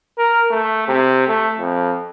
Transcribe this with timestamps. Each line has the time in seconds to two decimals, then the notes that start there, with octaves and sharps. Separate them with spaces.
0.18 A#4
0.50 A3
0.88 C3
1.28 A3
1.58 F2